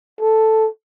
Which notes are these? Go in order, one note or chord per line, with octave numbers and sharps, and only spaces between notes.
A4